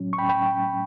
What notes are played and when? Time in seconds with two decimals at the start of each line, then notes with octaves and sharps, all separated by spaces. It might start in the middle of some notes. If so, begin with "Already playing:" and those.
Already playing: A2 F#3 C#4
0.13 C#6
0.18 G5 B5
0.29 G5 B5